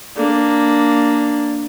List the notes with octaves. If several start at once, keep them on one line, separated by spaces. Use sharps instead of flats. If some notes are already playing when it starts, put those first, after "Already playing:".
A#3 D4